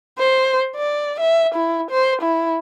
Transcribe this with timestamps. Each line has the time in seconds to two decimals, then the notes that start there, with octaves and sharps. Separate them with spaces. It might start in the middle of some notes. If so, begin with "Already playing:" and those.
0.19 C5
0.76 D5
1.20 E5
1.55 E4
1.91 C5
2.22 E4